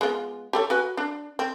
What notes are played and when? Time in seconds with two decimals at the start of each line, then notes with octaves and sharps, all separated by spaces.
0.01 G#3 B3 F4
0.53 G4 A4 C#5
0.70 F#4 B4 G#5
0.97 D4
1.39 C4